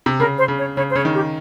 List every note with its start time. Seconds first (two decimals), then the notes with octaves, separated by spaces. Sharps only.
0.06 C3
0.20 C#3 A#4
0.38 C5
0.48 C#3
0.58 C#5
0.77 C#3 C#5
0.90 C5
0.95 C#3 C#5
1.05 D#3
1.14 G4